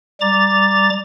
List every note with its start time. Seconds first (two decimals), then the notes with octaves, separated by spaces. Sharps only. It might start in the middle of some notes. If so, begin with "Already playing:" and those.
0.21 G3 A#5 D6 A6